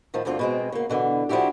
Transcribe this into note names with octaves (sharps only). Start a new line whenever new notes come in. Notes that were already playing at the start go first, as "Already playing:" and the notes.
A2 D#3 F3
D2 G2 D3 C4 F4
B2 G#3 C4
C#3 A#3
B2 D3 E3
F3 D4 E4 F#4 G4